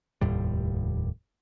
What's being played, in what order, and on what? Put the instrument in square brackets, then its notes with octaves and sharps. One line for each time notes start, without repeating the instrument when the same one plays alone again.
[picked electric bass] F1 D#2 A2 G3